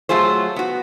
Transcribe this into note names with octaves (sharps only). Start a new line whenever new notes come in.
F#3 A3 F4 G#4 C5
B3 F#4